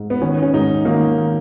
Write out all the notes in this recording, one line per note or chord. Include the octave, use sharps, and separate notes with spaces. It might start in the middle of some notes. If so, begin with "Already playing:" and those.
Already playing: G#2
B3
D#3 C#4
C#4
G#2 D#4
D#3 A#3